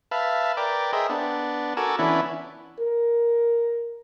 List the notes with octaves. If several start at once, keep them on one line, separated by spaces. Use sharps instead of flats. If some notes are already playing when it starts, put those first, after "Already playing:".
B4 E5 F5 A5
A#4 B4 D5 G5
G#4 A#4 C5 D#5 E5 G5
B3 D4
F#4 A4 A#4 G#5 D6 E6
E3 B3 C#4 D4 E4
A#4